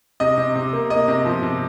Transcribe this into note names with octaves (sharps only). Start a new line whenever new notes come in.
C3 D#5
C3
C3
A#3
A#3 D#5
C3
F3
C3